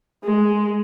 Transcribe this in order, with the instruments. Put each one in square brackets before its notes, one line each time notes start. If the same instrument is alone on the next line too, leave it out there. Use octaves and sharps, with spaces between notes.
[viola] G#3